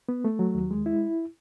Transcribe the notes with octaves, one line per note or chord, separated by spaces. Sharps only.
B3
A3
F#3
D#2
G#3
E4